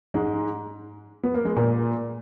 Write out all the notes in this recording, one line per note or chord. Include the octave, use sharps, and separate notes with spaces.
G#2 G#3
B3
A#3
G#3
A#2 A#3